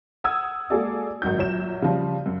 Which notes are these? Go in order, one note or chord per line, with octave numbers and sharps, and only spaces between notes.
F#5 D#6 E6 G#6
G#3 A#3 F#4 G#4 A4 D5
G#1 F#2 F#4 G6
A#1 F#3 E7
C#3 F3 G3
F#2